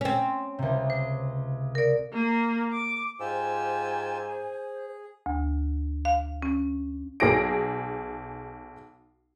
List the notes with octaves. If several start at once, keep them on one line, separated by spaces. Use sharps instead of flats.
C4 C#4
C#2 C3
C5
A#4 D5
A#3
D6
G#2 F4 G4 C5 G#5 E6
G#4
D2
F5
C#4
B1 G#4 A#6 D7